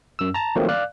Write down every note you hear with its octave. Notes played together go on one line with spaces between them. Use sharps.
F#2 E6
A5 A#5
D#3 F3 F#3 A3 A#3 C4
D5 F5 F#6